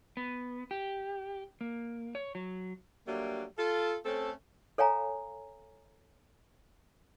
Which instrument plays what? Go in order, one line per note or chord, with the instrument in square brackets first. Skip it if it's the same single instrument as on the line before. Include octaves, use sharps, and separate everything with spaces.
[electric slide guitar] B3
G4
A#3
C#5
F#3
[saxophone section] F#3 G3 A3 A#3 D4
F4 A4
A3 C4 C#4 A4
[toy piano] A4 C#5 F5 G#5 A#5